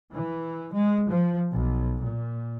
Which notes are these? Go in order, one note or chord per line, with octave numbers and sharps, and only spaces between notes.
E3
G#3
F3
B1
A#2